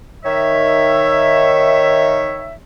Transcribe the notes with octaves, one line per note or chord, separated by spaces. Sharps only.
D#3 C#5 E5